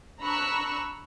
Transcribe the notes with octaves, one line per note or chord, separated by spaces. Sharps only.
D4 A#5 B5 C#6 E6 F#6